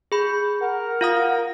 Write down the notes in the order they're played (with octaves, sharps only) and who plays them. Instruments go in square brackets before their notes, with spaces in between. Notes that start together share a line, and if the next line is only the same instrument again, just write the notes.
[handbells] G#4 B5 [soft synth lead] G6
[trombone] A#4 [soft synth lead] F#5
[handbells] F4 F5 D#6